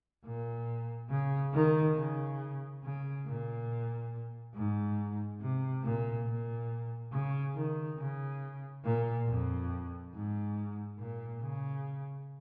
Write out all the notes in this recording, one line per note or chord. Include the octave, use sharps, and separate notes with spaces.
A#2
C#3
D#3
C#3
C#3
A#2
G#2
C3
A#2
A#2
C#3
D#3
C#3
A#2
F2
G#2
A#2
C#3